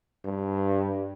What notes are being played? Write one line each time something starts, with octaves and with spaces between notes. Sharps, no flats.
G2